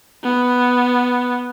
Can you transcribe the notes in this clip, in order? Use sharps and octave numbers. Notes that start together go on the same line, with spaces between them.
B3